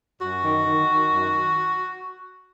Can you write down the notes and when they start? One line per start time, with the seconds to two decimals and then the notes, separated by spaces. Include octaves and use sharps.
0.21 F#2 F#4
0.43 D#3
0.66 D#3
0.88 D#3
1.10 F#2